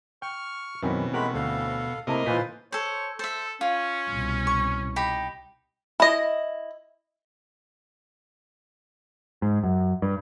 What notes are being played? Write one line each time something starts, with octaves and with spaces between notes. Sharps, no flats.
G5 C#6 F6
F#2 B2 D#3 E3 C4 C#4 E4
G#3 A3 G4 A#4 F#5 B5
D2 A4 F5
C3 A3 A#3 E4 D#5 A5 A#5
A#2 E3 F4 B4 C5 G#5 B6
A4 C5 C#5
A4 C5 E5
C#4 F4
C2 B2
C#6
D#4 G4 B5
E4 D#5
G#2
F#2
G2